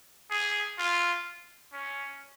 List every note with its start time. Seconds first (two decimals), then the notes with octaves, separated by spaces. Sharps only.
0.30 G#4
0.78 F4
1.73 C#4